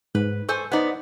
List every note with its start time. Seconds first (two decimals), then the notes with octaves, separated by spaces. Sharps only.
0.15 G#2 B4
0.49 A4 C5 G#5 C#6
0.72 B3 D#4 C5 D5 F#5